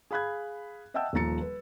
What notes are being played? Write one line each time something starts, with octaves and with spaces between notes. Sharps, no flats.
G#4 F5 B5 F#6 G#6
D#5 E5 F#5 G5 A5 E6
D#1 D#2 F3 A#5 A6 C#7
B4